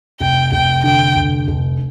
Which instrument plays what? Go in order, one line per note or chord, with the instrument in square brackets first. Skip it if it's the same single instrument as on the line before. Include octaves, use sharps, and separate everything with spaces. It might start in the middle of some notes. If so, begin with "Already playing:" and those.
[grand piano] F1 [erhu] G5
[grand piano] F1 [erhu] G5
[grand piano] D3 [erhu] G5
[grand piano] F1
F1